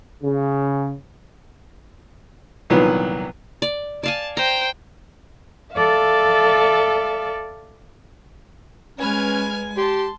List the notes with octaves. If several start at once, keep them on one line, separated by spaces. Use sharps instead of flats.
C#3
C2 A#2 D#3 E3 F#3 B3
D5
D5 F5 G#5 A5
C5 G5 A#5
A4 D5 E5 F5
G#3 C#4 B4 G#5 F6 G#6
G4 A5 C6